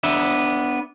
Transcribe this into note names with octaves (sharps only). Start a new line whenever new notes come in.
B3 D4 E5